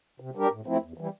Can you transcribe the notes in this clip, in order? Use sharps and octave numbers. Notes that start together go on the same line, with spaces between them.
C3
G3 D4 G4 A#4
A2
F3 A3 C4 E4
E2
E3 G3